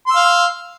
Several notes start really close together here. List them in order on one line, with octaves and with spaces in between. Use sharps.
C6 E6 F5